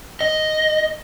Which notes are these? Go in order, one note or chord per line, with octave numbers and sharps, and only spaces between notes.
D#5